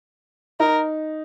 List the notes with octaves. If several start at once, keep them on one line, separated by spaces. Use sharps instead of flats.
D#4 A#4